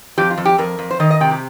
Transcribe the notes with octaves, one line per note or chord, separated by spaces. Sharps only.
F2 G4
F4
F2
G4
F2 A#4
F2
C5
D#3 D#5
D#5
C3 G5
G4